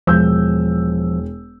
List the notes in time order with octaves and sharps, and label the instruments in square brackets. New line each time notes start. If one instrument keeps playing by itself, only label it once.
[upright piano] E1 E6 G6 [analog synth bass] F3